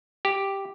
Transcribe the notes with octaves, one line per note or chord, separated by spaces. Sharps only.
G4